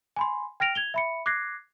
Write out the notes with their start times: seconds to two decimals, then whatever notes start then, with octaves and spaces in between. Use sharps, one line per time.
0.16 G#5 B5 C6
0.60 G5 F6 A#6 D7 F7
0.75 G#6 F7 G7
0.94 E5 B5 C#7
1.26 D6 F#6 G#6 A#6 C7